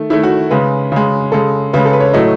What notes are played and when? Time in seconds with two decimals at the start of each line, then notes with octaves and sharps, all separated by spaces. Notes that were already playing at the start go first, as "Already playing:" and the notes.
Already playing: D#3 A3
0.10 D#3 A3 E4
0.23 F#4
0.50 C#3 G#3 B4
0.92 C#3 G#3
1.32 C#3 G#3 A4
1.73 C#3 G#3 B4
1.86 A4
1.93 B4
2.00 C#5
2.13 A2 F#3 A3 D#5